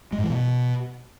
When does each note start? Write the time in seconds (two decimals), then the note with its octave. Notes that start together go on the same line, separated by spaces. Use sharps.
0.12 G#3
0.18 G#2
0.24 E3
0.30 B2